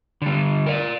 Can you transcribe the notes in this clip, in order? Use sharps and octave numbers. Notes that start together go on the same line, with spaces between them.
D3 G3
A#4 D5